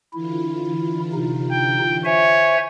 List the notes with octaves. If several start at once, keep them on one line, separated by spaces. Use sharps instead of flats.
D3 E3 E4 F4
C3 D#4
G5
C5 C#5 E5 G#5